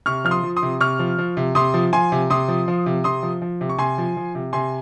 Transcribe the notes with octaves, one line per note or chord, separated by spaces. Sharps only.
C3 C#6 F6
F3 F6
C6 D#6
F3
C6 D#6
C3
C3 C#6 F6
F3
F3
C3
C3 C6 D#6
F3
F3 G#5 C6
C3
C3 C6 D#6
F3
F3
C3
C3 C6 D#6
F3
F3
C3
C#6
C3 G#5 C6
F3
F3
C3
C3 G#5 C6